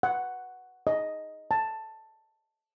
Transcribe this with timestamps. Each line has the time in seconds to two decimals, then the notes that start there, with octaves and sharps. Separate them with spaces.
0.03 F#5
0.87 D#5
1.51 A5